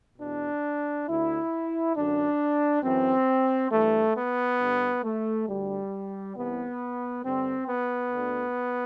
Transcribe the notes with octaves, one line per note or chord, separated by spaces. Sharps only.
E2 B2 D4
D2 D3 E4
F#2 D3 D4
F#2 E3 C4
G2 E3 A3
B3
G2 D3
A3
D2 D3 G3
C2 C3 E3 B3
G2 D3 C4
B3
D2 D3